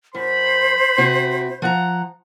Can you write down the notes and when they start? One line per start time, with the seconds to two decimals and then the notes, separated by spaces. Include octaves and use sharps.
0.15 F#2 C5 B5
0.98 C3 F#4
1.62 F3 F#5 A#5